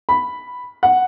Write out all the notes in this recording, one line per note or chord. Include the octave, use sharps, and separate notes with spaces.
B5
F#5